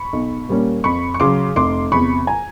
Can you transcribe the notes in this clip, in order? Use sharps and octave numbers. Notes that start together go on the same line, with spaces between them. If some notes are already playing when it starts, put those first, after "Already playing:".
Already playing: B5 C#6
B1
A#2 G3 A#3 C#4
F2 B5 C#6
C#6
C#3 F#3 C6 D6
F1 C6 D6
E2 C3 B5 C#6
G#5 A#5